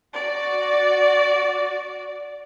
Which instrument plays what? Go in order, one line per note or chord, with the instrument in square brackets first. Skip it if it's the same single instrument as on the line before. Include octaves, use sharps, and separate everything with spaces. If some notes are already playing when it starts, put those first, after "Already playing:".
[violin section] F#4 D5